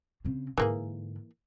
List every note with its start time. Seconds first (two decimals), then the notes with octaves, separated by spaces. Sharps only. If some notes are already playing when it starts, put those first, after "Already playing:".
0.25 C#3 C4
0.58 G#2 D3 E3 A#3 G#4